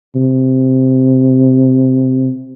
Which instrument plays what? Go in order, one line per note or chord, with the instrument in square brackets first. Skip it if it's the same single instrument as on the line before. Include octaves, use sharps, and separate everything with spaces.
[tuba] C3